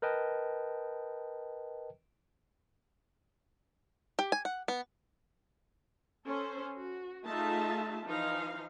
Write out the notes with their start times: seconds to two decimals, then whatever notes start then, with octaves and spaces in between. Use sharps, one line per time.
0.02 A#4 B4 D#5 G5 A5
4.19 G4
4.32 G#5
4.45 F#5
4.68 B3
6.25 C#4 A4 C5
6.76 F#4
7.25 A3 D#4 F4 G#4 E5 A5
8.05 E3 F3 D#4 F5